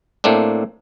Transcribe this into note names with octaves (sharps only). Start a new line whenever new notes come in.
A2 A3 A#3 C4 D4